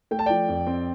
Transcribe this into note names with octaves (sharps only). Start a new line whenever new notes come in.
A3 G5
A5
F3 D5 G5
F2
C4